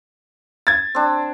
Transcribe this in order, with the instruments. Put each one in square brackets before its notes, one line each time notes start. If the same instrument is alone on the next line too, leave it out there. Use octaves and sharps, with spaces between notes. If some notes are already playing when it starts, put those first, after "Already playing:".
[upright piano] G#6 A6
[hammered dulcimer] C4 D4